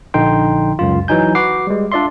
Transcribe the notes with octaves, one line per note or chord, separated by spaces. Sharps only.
A#1 D3 D#4 G5 C6
C#2 F#2 F4
E3 F#3 D#4 G#5 G6
F#4 B4 D6 C7
G3 G#3
D4 F4 D5 E5 C6